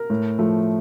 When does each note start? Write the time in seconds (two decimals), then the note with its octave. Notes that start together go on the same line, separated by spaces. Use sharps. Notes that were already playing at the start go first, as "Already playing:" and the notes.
Already playing: A#4
0.10 A2
0.39 F3 A3